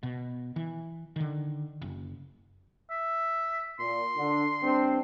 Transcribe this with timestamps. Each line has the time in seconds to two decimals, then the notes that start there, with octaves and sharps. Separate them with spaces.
0.03 B2
0.56 E3
1.16 D3 D#3
1.82 F#1
2.90 E5
3.80 A#2 C6
4.17 D3
4.62 G2 C4 D4